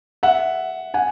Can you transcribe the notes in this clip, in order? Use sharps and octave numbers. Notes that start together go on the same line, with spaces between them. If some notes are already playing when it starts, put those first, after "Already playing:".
E5 F#5
F#5 G#5